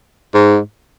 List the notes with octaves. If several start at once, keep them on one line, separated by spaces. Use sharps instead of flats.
G#2